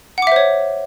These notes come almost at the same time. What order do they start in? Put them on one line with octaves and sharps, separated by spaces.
F#5 D6 E5 C5 C#5